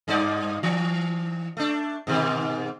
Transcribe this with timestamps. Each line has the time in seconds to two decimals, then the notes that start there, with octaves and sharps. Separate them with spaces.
0.08 G2 D#4 D5
0.63 E3
1.57 A3 D4
2.07 G#2 B2 D#3